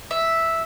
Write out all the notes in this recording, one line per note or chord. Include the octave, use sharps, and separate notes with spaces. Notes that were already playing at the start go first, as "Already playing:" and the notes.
E5